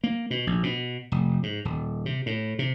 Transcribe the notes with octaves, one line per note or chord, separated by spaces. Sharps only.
A#3
B2
A#1
B2
F1
G#2
D#1
C3
A2
C3